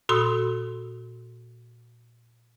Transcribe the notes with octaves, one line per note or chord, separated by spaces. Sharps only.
A#2 F#4 A4 C6 D#6 E6